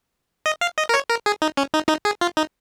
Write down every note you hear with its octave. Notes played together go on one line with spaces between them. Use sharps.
D#5
F5
D#5
A#4
C#5
A#4
G#4
D#4
C#4
D#4
D#4
G#4
F4
D#4